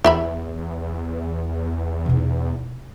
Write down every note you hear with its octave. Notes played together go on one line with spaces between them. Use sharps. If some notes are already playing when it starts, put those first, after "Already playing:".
E2 E4 E5 B5
B2 D#4